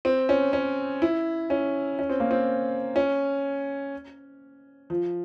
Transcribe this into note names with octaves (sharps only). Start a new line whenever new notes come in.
C4
C#4
C#4
E4
C#4
C#4
C4
A#3
C4
C#4
F3